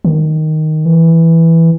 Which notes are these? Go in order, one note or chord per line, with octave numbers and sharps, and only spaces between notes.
D#3
E3